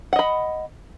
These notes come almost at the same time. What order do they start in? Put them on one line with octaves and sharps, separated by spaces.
F#5 D#5 B5